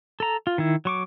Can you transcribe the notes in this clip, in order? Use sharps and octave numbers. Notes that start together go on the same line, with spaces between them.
A4 A#5
F4
D#3 E4
F#3 C#6 D6